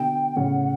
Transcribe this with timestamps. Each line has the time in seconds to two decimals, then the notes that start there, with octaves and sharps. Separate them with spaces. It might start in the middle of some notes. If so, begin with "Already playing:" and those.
Already playing: B2 D3 G5
0.36 A2 C#3 F#5